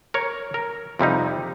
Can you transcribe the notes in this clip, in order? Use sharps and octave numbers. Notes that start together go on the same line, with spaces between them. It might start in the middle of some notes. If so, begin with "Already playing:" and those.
A#4 C#5
A#4
F2 C3 G3 D#4